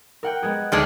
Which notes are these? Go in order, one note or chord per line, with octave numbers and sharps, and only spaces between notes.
A#4 F#5 G5
G#3 B3 G#4
D2 D#3 G#3 D4 G#4 C7